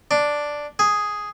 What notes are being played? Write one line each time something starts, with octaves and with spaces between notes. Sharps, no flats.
D4
G#4